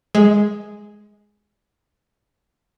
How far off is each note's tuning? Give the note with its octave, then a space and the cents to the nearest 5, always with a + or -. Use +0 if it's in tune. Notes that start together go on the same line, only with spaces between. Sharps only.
G#3 +0 D#5 +35